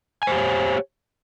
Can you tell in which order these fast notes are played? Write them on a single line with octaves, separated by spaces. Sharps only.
G#5 C5 G4 C#5